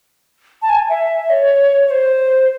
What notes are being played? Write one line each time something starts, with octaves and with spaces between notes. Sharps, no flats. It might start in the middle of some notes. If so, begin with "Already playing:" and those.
A5
G#5
E5
C#5
C#5
C5